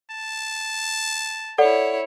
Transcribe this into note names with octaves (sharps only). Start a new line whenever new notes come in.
A5
E4 A4 C#5 D5 F#5